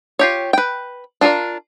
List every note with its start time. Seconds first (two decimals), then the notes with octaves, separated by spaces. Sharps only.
0.19 F4 G4 C#5
0.53 B4 G5
1.21 D4 F4 A4 A#4 D5